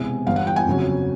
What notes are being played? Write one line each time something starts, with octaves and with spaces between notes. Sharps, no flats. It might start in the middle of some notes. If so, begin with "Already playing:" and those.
Already playing: E1 E2 C3 G#5
G1 G2 E3 F5
F#5
G5
G#5
G1 F2 C#3 F#3